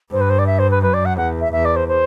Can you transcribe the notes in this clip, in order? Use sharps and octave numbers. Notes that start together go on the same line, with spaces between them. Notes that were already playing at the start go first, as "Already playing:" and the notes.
G2 C5
B4
C5
D5
E5
C5
B4
F#2 B4
D5
F#5
E2 F#5
E5
E2 E5
D5
C5
C5